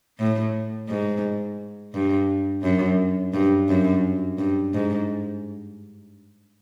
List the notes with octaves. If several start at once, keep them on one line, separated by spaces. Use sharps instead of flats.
A2
G#2
G2
F#2
G2
F#2
G2
G#2